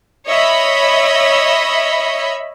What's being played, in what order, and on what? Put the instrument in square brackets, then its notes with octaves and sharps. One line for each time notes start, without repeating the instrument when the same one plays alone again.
[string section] C#5 D#5 E5 B5